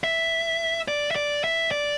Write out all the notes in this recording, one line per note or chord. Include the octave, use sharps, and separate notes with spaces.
E5
D5
E5
D5
E5
D5